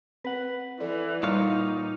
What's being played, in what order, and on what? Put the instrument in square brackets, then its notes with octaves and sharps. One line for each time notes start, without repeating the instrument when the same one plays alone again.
[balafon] C4 [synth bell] B4 F#5
[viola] E3 [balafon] A4 D5
[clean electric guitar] A#2 C#5 F5 [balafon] G3 [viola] D#4